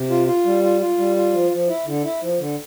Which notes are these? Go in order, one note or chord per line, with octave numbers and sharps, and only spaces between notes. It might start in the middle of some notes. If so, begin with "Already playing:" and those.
Already playing: C3
F4
F4
G3
F4
F4
G3
F4
F3
F3
E4
D3
E4
F3
D3